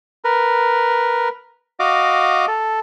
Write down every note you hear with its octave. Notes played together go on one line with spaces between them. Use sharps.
A#4 B4
F#4 D#5 F5 D6
A4